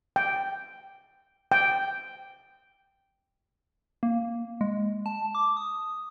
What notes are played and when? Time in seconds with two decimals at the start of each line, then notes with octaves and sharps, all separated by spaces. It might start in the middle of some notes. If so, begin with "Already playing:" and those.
0.16 G5
1.52 G5
4.03 A#3
4.61 G#3
5.06 A5
5.35 D6
5.57 D#6